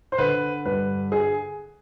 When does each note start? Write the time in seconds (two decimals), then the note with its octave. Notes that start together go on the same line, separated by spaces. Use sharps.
0.12 C5
0.18 D3 B4
0.65 G2 B4
1.12 G#4